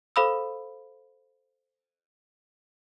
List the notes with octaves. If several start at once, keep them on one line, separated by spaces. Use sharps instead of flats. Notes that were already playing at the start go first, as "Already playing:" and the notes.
A4 C5 F5 B5 D#6 E6